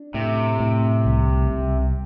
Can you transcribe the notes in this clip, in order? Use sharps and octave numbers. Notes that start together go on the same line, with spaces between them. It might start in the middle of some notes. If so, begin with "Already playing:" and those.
Already playing: D4
A2 C3
A2
C2
C2